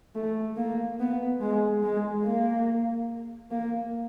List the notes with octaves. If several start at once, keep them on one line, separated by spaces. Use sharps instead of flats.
A3
A#3
B3
G#3
G#3
A#3
A#3